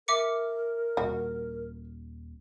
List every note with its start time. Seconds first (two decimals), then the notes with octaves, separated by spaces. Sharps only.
0.08 A#4 E5 D6 C#7
0.97 D#1 F#4